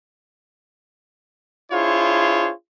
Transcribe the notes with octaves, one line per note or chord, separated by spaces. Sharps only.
D4 E4 F4 G#4 C5 C#5